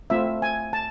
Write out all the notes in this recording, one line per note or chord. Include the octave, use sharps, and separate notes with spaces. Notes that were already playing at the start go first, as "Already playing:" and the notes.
A3 C4 F4 E5
G#5
A5